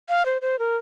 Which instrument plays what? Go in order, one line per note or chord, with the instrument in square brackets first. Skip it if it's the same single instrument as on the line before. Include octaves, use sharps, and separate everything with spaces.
[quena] F5
C5
C5
A#4